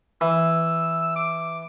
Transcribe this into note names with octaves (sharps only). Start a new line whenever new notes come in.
E3 E6
D6